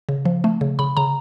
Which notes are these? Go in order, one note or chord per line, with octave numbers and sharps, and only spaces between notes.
C#3
F3
A3
C#3
C#3 B5
C#3 A#5